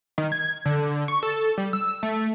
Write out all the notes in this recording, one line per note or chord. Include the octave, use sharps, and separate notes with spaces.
D#3
G#6
D3
C#6
A4
G3
E6
A3